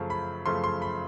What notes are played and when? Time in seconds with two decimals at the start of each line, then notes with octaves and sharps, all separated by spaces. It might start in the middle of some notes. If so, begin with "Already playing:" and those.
Already playing: F#2 C#3 F3 A3 A5
0.10 B5
0.46 F#2 C#3 F3 A3 C6
0.64 C6
0.82 B5